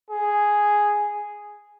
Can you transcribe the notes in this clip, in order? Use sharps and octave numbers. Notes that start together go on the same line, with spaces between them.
G#4